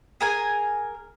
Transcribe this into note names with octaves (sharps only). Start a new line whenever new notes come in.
G#4 A#4 G#5